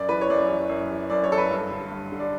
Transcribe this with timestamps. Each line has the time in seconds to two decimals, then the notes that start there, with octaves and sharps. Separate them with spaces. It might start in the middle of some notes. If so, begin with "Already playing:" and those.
Already playing: F#2 D5
0.09 E3 B4
0.21 C#5
0.30 F#2 D5
0.49 E3
0.69 F#2
0.91 E3
1.10 F#2 D5
1.24 C#5
1.31 E3 A4
1.38 B4
1.51 G2
1.71 D3
1.91 G2
2.12 D3
2.20 D5